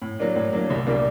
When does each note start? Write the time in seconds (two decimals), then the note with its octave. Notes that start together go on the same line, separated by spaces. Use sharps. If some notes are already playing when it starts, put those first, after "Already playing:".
0.02 A2
0.19 F#3 A#3 D4
0.36 A2
0.53 F#3 A#3 D4
0.70 C2
0.87 A#2 G3 A#3 D4